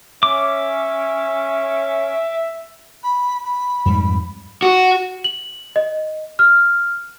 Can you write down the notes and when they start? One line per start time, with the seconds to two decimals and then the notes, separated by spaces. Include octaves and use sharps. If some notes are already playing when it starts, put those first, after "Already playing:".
0.23 C#4 E5 D6
3.03 B5
3.44 B5
3.86 F2 G#2 G3
4.62 F#4
5.24 F#7
5.76 D#5
6.39 F6